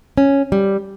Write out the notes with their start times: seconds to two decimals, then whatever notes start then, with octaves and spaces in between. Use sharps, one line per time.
0.18 C#4
0.52 G3